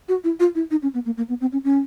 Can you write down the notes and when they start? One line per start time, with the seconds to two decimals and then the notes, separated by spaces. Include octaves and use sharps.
0.09 F#4
0.24 E4
0.40 F4
0.55 E4
0.71 D#4
0.83 C#4
0.94 B3
1.06 A#3
1.17 A#3
1.29 B3
1.41 C4
1.53 C#4
1.64 C#4